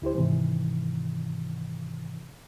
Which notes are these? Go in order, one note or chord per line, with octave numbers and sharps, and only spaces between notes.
D2 E4 G4 C5
G#2 C3 D#3 E3